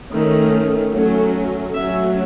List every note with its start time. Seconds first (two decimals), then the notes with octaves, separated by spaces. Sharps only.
0.12 D#3 A3 C#4
0.93 F#3 A3 C#4
1.73 F#3 A3 C#4 E5